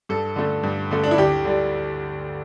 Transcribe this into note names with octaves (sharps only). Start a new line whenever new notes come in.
G2 A4
D3 A3
G2
D3 A3
D4
E4
D2 G4
D3 G3